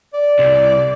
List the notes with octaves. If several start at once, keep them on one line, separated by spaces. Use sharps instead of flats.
D5
C2